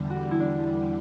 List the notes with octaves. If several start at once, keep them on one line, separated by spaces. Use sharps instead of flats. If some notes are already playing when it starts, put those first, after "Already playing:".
Already playing: E2 D3 G3
F#4
E4
D4